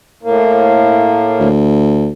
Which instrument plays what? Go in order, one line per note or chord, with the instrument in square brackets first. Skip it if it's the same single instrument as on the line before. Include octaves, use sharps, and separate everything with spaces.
[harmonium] A2 A#3
[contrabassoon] D2